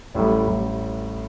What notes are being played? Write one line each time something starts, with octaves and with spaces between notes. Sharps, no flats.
A1 A2 G3
A1 A2 G3